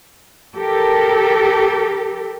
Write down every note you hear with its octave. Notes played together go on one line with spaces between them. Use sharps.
G4 A4 A#4